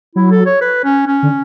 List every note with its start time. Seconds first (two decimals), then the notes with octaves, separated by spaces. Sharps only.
0.15 F#3 E4
0.31 A4
0.46 C#5
0.61 B4
0.84 C#4
1.07 C#4
1.23 D3